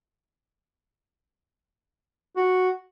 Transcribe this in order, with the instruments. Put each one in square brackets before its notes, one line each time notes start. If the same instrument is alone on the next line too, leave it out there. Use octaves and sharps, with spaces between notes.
[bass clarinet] F#4